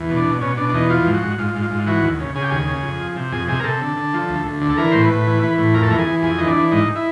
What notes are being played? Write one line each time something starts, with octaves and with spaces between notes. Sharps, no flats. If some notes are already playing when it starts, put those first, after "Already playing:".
Already playing: E2
B2
D4
B2
B2 C#4
B2 D4
D4
E2 D#4
F3 F4
G#2
F#4
G#2
G#2 F4
G#2
F4
G#2
E3 F#4
D#2
C#3
C#3 G#4
G4
D#2 G#4
C#3
F2
F3
C3
F2 G#4
C3 G#4
A#4
C3 A4
D3
D3
F3
D2
D2
D3
A4
E3 A#4
A2 C5
B4
A2
E3
E3
A2
F2 A#4
A4
E3 A#4
G#4
E3
F2 G#4
E3 D#4
D4
E3
G#2 D#4
E4